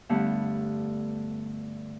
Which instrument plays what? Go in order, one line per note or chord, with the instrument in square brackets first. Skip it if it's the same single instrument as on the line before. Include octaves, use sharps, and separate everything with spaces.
[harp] G2 D3 A3 B3